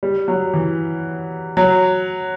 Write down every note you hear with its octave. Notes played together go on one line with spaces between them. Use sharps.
G3
F#3
E3
F#3